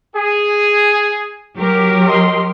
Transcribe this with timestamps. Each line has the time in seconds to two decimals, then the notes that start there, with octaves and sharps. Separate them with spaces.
0.15 G#4
1.56 F#3 G4 A#4
2.07 D#5 C6